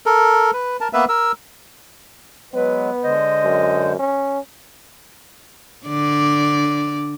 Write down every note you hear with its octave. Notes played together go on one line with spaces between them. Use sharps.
A4 A#4
B4
A#4 A5
A#3 B3 B4 E5
A#4 E6
F#3 G#3 B3 B4
D3 G#3 C5 D#5
F#2
C#4
D3 D5